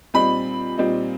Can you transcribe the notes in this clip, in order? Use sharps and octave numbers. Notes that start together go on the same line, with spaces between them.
A#2 G3 C4 D#4 B5
A#2 G3 C4 D#4